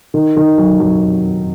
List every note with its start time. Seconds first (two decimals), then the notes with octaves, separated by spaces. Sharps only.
0.14 D#3
0.37 D#3
0.58 F#3
0.80 F#3